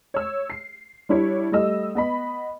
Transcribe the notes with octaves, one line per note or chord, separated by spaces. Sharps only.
C#5 E6
C7
G3 D4 E4 C#5
G3 A3 D#5 E6
B3 D#5 B5